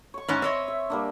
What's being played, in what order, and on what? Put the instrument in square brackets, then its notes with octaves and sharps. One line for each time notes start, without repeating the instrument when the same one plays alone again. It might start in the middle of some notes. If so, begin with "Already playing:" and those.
[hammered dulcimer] C#5 C#6
[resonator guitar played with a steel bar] G#2 C#4 [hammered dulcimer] B5
[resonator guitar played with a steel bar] C4 C#5 D#5 [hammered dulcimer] E5
[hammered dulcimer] E5
G3 A#3 D4